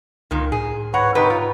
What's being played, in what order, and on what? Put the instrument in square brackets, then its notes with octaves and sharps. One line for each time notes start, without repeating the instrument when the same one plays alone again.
[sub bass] C#2 [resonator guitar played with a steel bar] A#2 D#3
[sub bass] A2 [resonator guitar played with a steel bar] G#4
[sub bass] G#2 [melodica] B4 C#5 [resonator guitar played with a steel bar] F#5 A#5
[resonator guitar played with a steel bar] C3 G4 B4 [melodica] D#4
[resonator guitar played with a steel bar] F4